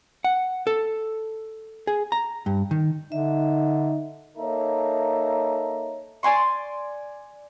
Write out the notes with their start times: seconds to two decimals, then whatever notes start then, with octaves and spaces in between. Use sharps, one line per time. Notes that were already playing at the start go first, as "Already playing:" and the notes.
0.24 F#5
0.67 A4
1.87 G#4
2.12 A#5
2.46 G2
2.71 D#3
3.12 D3 D#4 E5
4.37 A#3 D#4 A4 C#5 E5 A#5
6.23 D5 G#5 C6 C#6